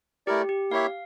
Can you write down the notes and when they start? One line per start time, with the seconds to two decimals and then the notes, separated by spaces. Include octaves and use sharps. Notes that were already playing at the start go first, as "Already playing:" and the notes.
0.27 A3 E4 G4 A#4 D5
0.49 G4
0.71 A#3 E4 G4 C#5 E5 F5